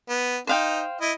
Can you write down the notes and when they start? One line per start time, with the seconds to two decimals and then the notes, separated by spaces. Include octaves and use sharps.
0.09 B3
0.47 D#4 C5 F5 G5
1.01 E4 D#5